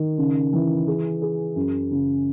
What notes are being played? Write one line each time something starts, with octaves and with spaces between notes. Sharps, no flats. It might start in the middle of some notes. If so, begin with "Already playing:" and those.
Already playing: D#3
C#3
E3
G#4
G#4
F#2
C#3